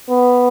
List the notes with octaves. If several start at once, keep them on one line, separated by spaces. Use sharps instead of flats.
B3